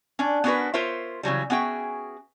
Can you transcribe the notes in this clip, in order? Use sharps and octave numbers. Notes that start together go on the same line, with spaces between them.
C#4 D4 D5
B3 C#4 D4 F#4 A#4 B4
F4 A#4 C5 C#5 E5
C#3 E3 F#3 G3
B3 C#4 F#4 G#4 E5 G5